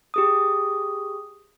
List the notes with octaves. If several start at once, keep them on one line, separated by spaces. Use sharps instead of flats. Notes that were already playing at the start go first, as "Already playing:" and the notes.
G4 G#4 D#6